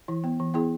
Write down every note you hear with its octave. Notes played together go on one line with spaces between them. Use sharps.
E3 E4
B3
E3
B3 E4 G#4